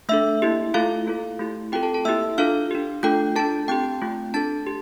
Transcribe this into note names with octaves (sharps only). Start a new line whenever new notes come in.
A3 D4 A4 E5 E6
A#3 E4 G4
A3 E4 F4 A4 F5
A#3 F4 A4
A3 E4 G4
C4 F4 G4 A4 G5
A4 A5
A4 A5
A#3 E4 G4 E5 E6
D4 F4 A4 F5 F6
D4 G4
A3 D4 F4 A4 G5 G6
D4 F4 A4 A5 A6
C4 G4 G5 G6
A3 C4 F4
D4 A4 A5 A6
G4